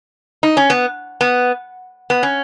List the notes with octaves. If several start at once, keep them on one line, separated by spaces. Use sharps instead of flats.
D#4
C#4
B3
B3
B3
C#4